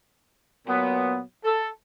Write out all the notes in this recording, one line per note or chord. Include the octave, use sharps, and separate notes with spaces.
A#2 F#3 B3
A4